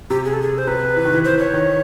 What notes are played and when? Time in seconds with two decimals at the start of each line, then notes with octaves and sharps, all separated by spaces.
0.10 C3 G4
0.25 G#4
0.33 A4
0.42 G#4
0.58 C5
0.67 C3 B4
0.97 E3
1.05 D#3
1.14 E3
1.25 C5
1.39 C#5
1.53 D#3